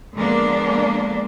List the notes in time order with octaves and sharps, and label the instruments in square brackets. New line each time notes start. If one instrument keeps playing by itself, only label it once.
[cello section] D3 F3 G#3 A#3 B3 D4